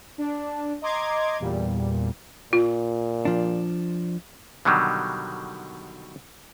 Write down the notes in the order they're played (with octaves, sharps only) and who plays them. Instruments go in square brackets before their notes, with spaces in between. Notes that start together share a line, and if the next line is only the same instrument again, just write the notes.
[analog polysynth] D4
D#5 A#5 C6 D6 G#6
E2 A#2 G3
[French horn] A#2 [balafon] F4
[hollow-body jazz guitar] F3 D4
[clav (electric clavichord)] B2 D3 D#3 F#3 G3